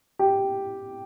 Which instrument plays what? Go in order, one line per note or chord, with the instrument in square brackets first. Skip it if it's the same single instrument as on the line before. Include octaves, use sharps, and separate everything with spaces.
[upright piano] G4